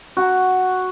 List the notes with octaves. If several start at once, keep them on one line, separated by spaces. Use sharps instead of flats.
F#4